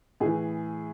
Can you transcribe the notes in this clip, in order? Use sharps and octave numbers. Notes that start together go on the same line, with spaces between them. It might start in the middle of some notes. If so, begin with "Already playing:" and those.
A2 E3 G#4